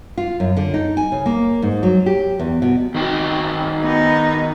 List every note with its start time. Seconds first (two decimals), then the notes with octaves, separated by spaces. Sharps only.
0.18 F4
0.40 F#2
0.57 D3
0.74 D#4
0.97 G#5
1.12 C#3
1.26 A#3
1.62 G#2
1.83 F#3
2.06 G4
2.39 E2
2.62 B2
2.95 D#3 F#4 G5
3.80 B3 D#4